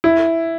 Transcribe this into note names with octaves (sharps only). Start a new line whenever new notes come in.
E4